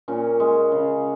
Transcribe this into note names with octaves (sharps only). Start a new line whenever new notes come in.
A#2 C#4
G#3
C#3